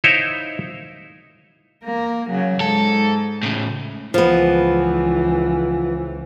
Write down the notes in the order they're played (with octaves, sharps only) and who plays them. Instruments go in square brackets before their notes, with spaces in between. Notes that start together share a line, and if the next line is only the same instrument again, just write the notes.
[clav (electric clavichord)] D#4 E4 C5 C#5 E5 F5
[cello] A#3 A#4
C#3 F#3
[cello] G#2 [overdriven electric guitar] A4
[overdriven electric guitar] A2 C#3
[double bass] C#2 E3 [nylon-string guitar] F3 B3